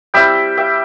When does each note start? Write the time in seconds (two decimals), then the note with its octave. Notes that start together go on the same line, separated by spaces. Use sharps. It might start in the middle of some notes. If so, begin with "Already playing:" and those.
0.14 G3 C4 E4 E5 G5
0.57 E5 G5